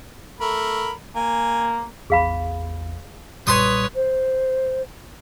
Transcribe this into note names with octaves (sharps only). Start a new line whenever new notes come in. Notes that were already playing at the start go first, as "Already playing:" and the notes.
A3 A#4 B5
A#3 G#5
A1 E2 G#4 F5 B5
B1 A#2 G3 B4 C#5 C6 D#6
C5